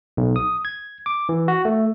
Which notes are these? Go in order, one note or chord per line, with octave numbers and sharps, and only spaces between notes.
B1
D#6
G#6
D6
E3
F#4
A3